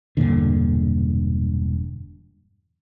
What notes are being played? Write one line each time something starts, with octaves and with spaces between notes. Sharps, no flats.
E1 G2 A#2 D3